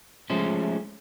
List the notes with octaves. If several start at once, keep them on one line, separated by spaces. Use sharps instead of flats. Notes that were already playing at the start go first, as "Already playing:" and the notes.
F3 G#3 A3 C#4 C5